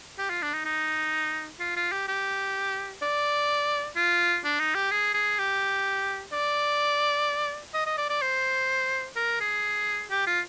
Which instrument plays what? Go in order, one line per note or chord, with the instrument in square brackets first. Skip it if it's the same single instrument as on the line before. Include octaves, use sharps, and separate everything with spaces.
[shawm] G4
F4
D4
D#4
D#4
F4
F4
G4
G4
D5
F4
D4
D#4
G4
G#4
G#4
G4
D5
D#5
D#5
D5
D5
C5
A#4
G#4
G4
F4